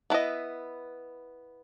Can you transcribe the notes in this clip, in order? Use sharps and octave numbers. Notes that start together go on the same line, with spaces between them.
B3 E4 B4 D#5